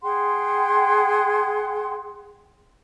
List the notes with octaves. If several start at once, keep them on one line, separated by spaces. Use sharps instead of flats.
G#4 F#5 G5 C6